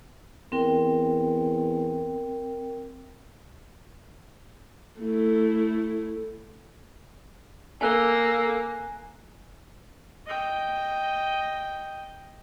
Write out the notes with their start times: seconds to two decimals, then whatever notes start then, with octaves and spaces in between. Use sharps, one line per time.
0.52 E2 C4 A#4 G5
5.01 A3 E4
7.81 A#3 A4 G#5 F#6 G7
10.26 D#5 G5